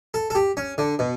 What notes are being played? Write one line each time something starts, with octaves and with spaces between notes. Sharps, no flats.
A4
A4
G4
C#4
D3
B2